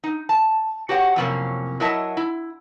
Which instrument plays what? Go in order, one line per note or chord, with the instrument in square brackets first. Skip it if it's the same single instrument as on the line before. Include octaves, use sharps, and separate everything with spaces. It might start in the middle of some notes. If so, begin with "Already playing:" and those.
[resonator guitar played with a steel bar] D#4
A5
F#4 G4 C#5 F#5
F2 A2 C3 F#3 A#3 C#4
F#3 E4 A#4 D#5 E5 A5
E4